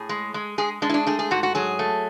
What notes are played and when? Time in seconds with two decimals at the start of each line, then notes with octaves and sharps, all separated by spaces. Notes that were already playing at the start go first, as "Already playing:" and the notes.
Already playing: A2 G#4
0.09 G#3
0.34 G#3
0.58 G#3 G#4
0.82 G#3 D4
0.90 E4
0.94 D4
1.06 A3 G#4
1.19 G#4
1.31 G#2 F#4
1.43 F#4
1.55 F#3 G#4
1.79 A3